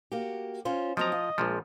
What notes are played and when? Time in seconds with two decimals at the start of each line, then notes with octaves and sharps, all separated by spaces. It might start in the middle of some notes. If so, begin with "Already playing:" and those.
0.12 A#3 F#4 G4
0.65 C#4 F4 C5
0.97 F3 F#3 C4 D#5 A#5
1.12 F4
1.38 A#1 A#2 F3 G#3